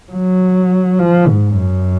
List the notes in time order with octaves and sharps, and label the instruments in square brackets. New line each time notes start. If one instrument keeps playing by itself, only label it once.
[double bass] F#3
F3
G#2
F#2